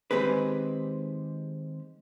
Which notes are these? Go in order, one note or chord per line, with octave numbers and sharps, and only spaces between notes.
D#3 G#3 C4 G4 G#4 B4